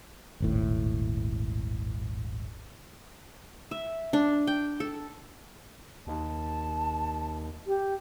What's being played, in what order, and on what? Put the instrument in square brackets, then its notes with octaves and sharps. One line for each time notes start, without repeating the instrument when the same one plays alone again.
[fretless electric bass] D#1 G#1 A2
[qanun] E5
D4
G5
A4
[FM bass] D#2 [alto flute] A5
[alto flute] G4